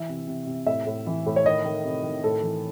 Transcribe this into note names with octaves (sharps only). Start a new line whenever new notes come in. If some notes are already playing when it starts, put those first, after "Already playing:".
Already playing: E3 E5
C3
C3
C3
A2 E5
A2
E3
A2
C#5
D#3 D#5
D#3
C3
D#3
A2 A4
E3